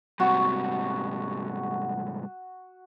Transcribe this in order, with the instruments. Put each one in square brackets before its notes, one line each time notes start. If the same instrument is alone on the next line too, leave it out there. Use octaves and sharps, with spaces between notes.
[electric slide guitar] G#2 C3 G3 [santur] F#4 C#6